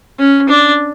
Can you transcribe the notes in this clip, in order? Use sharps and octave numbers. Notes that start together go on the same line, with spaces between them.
C#4
D4